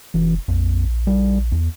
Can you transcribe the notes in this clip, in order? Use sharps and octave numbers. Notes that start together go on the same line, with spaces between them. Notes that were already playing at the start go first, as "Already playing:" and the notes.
F1 E3
A#1 F2
G3
E2